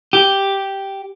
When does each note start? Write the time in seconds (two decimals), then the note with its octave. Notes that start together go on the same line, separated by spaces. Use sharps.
0.13 G4